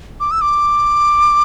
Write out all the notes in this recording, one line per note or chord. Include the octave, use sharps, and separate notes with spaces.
D6
E6
D6